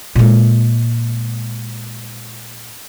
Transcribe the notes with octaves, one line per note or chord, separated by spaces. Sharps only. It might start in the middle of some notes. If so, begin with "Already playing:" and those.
A#2 G#3